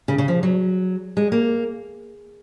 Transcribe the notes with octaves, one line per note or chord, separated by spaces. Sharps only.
C#3
C#3
F3
F#3
G#3
A#3